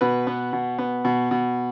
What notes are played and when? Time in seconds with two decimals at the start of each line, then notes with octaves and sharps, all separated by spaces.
0.01 B2 B4
0.27 B3
0.53 B2
0.79 B3
1.05 B2
1.31 B2